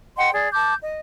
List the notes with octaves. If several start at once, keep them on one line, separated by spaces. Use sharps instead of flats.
D#5 F#5 G5 C6
G#4 D5
A5 D6 G6
D#5